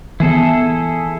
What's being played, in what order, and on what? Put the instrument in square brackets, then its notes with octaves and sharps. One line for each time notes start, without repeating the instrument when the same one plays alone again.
[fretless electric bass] E3 B3 [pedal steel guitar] E4 G#4 A4